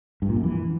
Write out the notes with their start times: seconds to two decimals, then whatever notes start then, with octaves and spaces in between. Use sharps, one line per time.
0.22 G2
0.29 A#2
0.36 F#2
0.44 E3